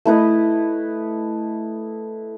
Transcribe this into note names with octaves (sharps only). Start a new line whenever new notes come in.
A3 E4 B4 D#5